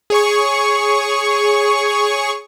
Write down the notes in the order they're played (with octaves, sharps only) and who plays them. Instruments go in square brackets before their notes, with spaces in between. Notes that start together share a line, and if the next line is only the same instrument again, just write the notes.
[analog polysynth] G#4 C#5 C#6